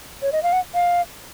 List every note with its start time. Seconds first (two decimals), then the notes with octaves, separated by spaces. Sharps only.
0.22 C#5
0.32 D#5
0.43 F5
0.53 F#5
0.75 F5